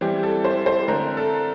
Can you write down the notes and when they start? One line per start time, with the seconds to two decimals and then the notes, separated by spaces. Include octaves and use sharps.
0.01 E3 G3 C4 G4
0.23 A4
0.45 C5
0.66 C5
0.88 D3 A3 C4 A#4
1.17 A4